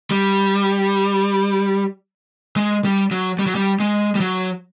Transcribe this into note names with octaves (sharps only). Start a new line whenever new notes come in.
G3
G#3
G3
F#3
G3
F#3
G3
G#3
G3
F#3